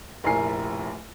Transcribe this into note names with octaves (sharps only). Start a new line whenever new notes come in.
F1 A#1 E4 A#4 G#5 C7